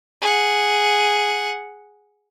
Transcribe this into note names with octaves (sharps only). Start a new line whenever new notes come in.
G#4 F#5